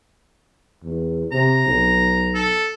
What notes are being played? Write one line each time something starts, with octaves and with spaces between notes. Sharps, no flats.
E2
C3 A#5
B1
A4